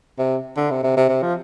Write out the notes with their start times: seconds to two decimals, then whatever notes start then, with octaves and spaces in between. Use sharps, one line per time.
0.18 C3
0.57 D3
0.71 C3
0.83 C3
0.97 C3
1.09 C3
1.22 F3